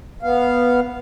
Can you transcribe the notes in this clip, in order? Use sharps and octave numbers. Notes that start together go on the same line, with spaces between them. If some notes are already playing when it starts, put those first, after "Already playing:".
B3 F5